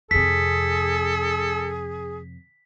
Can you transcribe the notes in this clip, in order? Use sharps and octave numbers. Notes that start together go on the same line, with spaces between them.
F2 C3 G#4 A4 B6